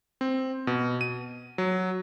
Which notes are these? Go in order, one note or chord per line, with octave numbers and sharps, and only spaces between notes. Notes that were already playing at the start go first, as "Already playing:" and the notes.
C4
B2
D#7
F#3